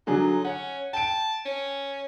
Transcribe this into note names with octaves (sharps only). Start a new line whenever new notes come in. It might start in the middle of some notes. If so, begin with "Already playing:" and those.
D3 F#3 D#4 G#4
C#4 F#5
G5 A5 D7
C#4